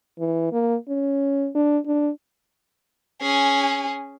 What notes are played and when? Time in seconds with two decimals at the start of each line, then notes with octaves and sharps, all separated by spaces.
0.19 E3
0.52 A#3
0.88 C#4
1.55 D4
1.86 D4
3.22 C#4 G#4